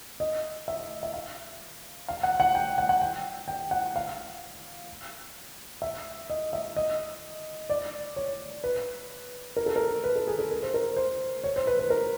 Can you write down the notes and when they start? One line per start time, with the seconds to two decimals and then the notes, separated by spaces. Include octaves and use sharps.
0.20 D#5
0.68 E5
1.03 E5
1.14 F5
2.08 F5
2.23 F#5
2.40 F#5
2.55 G5
2.78 F#5
2.89 F#5
3.01 G5
3.48 G5
3.71 F#5
3.96 F5
5.82 E5
6.30 D#5
6.53 E5
6.76 D#5
7.70 D5
8.16 C#5
8.64 B4
9.57 A#4
9.66 A4
9.76 A#4
10.04 B4
10.16 A4
10.27 G#4
10.39 A4
10.51 A#4
10.62 C5
10.74 A#4
10.96 C5
11.44 C#5
11.56 C5
11.67 B4
11.79 B4
11.90 A#4